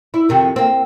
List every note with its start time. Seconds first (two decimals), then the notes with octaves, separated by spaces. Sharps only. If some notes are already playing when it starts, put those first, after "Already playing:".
0.14 E4
0.29 F2 C3 D#3
0.56 A#3 C4